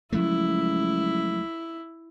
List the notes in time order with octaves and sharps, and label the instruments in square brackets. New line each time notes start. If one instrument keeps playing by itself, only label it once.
[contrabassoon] C#2 [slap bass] F3 F#3 A3 [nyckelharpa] E4